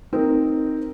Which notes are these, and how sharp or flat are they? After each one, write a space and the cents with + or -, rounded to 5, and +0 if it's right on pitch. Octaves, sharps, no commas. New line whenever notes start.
C4 +0 D#4 +0 A#4 -5